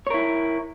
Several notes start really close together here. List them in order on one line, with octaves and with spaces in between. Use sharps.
C#5 A#4 E4